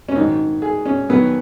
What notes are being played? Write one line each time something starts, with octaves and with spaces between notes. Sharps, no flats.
C#4
G#2 D#3 F#3 D#4
G#4
C#4
F#2 D#3 F#3 B3